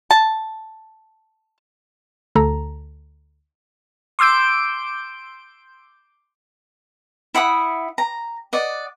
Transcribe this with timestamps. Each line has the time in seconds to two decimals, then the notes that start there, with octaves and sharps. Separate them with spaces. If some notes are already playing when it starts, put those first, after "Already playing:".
0.11 A5
2.35 D2 A4 A#5
4.19 C6 D6 E6 G6 D7
7.34 E4 F#5 B5 D#6
7.98 A#5
8.53 D5 D#5 F#5